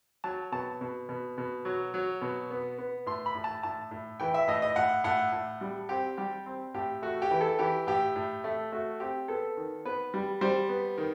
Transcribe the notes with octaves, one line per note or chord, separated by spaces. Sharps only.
F#3 A5
B2 A5
B2
B2
B2
F#3
F#3
B2
B3
B3
A2 C6
B5
A2
A5
A2 A5
A2
E3 G5
E5
A2 D#5
D#5
A2 F#5
A2 F#5
A2
G3
C4 G4
G3 G4
C4
A2 G4
A3 F#4
G4
E3
A4
E3 G4
A2 G4
A2
A3
A3 F#4
C4 G4
B3 A4
D#3
B3 B4
G3
G3 C5
B3
D#3